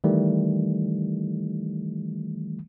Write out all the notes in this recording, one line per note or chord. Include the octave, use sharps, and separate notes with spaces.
D#3 E3 G3 A3